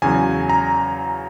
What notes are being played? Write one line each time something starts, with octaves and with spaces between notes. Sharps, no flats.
E2 C#3 F#3 G#5
A#5